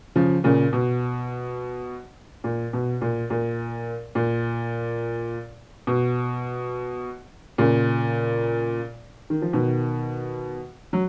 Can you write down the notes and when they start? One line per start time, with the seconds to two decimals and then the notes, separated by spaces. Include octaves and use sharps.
0.16 C#3 F3
0.44 A#2 C#3
0.73 B2
2.44 A#2
2.73 B2
3.01 A#2
3.30 A#2
4.15 A#2
5.87 B2
7.58 A#2 C#3
9.30 D#3
9.42 F3
9.53 B2 D#3
10.93 F#3